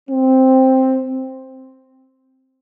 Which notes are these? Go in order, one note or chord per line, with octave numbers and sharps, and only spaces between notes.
C4